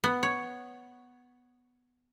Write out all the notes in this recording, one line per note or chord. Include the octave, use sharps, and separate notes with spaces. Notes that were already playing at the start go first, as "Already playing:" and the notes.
B3
C#5